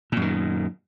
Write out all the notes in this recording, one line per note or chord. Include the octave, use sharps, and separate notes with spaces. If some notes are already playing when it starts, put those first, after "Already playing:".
F#2 A#2 D#3